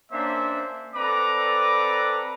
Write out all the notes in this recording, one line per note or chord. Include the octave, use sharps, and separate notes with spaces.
A#3 C#4 D4 C5 E5
C4 A4 B4 D5 A#5 D6